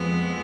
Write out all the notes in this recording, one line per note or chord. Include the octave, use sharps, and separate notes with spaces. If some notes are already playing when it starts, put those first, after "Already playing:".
Already playing: F2 F3 G#3 B3